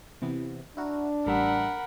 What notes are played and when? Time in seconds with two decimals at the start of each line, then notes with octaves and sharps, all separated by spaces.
0.22 C3 E3 B3
0.77 D4 E4 F#4 A#4
1.26 A1 G3 A#4 E5 F#5 B5